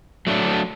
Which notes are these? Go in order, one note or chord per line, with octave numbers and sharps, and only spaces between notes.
F#3 A3 D4